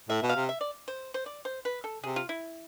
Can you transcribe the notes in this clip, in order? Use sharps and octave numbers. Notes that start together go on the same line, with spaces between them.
A2 E5
B2
F5
C3
E5
D5
C5
C5
D5
C5
B4
A4
C3 G#4
F4
E4